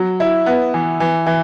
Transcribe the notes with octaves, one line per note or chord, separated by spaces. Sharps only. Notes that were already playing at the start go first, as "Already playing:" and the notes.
Already playing: F#3
E4
B3
E3
E3
E3